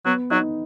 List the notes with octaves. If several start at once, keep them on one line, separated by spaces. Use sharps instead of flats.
F#3 B3
F#3 D#4